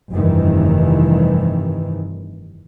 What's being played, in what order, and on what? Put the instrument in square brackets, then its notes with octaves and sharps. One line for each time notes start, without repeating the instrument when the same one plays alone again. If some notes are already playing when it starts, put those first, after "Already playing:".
[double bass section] F1 G2 C3 D#3 E3